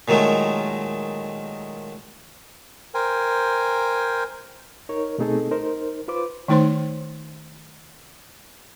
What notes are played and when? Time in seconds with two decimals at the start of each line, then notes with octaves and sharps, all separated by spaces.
0.08 A#2 D#3 F#3 G#3 A3
2.94 A#4 C5 G5 G#5
4.89 D#4 A#4 C#5
5.18 B2 A3 C4 D#4 G#4 A4
5.51 D#4 A#4 C5
6.08 F4 B4 C5 D6
6.48 D#3 A3 D#4 C5 C6